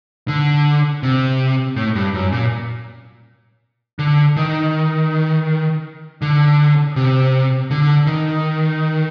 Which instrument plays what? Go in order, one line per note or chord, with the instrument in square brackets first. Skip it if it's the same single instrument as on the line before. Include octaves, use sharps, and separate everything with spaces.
[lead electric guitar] D3
C3
A2
G2
F#2
A#2
D3
D#3
D3
C3
D3
D#3